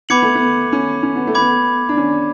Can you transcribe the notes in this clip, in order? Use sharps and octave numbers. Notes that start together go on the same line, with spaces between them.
B3 B5 D6 G#6 C#7 F#7
A3
B3
C#4
C#4
B3
A3
B3 B5 D6 G#6
D4
C#4